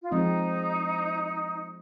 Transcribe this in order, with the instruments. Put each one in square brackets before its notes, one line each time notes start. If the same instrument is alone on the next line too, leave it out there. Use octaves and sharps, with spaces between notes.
[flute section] F4
[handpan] F3 G#3 C4 [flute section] D#4